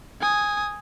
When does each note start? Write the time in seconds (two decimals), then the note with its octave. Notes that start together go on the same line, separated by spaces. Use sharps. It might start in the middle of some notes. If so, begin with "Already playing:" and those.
0.21 G#5 D#6